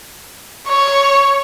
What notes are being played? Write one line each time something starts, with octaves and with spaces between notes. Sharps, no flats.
C#5